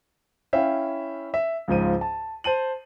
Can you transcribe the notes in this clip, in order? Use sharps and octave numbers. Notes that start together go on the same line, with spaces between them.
C#4 E4 E5 F5 G5
E5
C#2 G#2 F3 D#7
A5
C5 A5 D#7 F#7